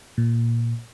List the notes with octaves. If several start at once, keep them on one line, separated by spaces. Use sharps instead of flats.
A#2